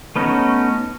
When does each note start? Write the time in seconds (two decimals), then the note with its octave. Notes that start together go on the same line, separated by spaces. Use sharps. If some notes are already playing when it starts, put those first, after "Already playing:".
0.16 A3 B3 C#4 D#4 F#4